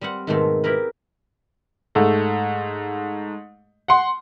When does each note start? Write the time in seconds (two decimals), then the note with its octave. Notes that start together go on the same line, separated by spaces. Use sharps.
0.01 G3 C4 F5 F#5
0.27 G#2 B2 D#3 G#3 A3 C4
0.64 E4 G4 A#4 B4
1.95 G#2 A3
3.88 F#5 C6